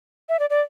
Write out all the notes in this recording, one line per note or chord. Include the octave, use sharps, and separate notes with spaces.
E5
D5
D5